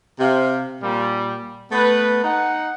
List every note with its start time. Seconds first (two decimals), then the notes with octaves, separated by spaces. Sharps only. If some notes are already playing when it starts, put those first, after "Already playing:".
0.20 C3 F5
0.82 A#2 G3
1.72 A3 B3 B4
2.24 D#4 F#5